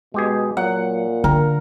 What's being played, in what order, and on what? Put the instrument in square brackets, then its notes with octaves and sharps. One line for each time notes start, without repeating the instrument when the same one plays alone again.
[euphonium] B2 [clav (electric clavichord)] G#3 G4 G#4
[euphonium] A#2 [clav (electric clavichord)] F#3 [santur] F#5
[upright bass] D3 [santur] A#4 [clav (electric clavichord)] G5